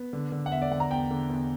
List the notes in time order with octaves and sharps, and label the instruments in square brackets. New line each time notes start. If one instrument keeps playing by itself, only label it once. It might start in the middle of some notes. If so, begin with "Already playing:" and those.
Already playing: [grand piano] B3
D3
D3
F#5
E2 E5
D5
D3 F#5
A#5
E2 G5
D3
E2